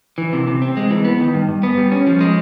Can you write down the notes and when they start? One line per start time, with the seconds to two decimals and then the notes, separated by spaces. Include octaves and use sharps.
0.18 E3
0.33 C3
0.48 C3
0.62 C4
0.77 G#3
0.91 E3
1.05 B3
1.20 D#3
1.34 G2
1.49 G2
1.63 B3
1.78 G3
1.92 C#4
2.07 F3
2.21 G#3